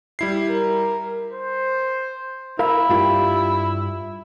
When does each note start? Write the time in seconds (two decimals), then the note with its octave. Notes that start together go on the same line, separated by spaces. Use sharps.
0.19 G3 E4 C7
0.50 A#4
1.33 C5
2.59 E4 A#4 F5 B5
2.89 G2 F4 G4